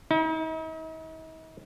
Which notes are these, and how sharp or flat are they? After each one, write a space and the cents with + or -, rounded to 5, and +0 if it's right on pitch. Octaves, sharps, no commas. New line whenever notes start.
D#4 +45